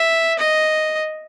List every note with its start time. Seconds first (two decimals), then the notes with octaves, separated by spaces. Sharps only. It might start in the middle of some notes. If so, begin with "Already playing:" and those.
Already playing: E5
0.38 D#5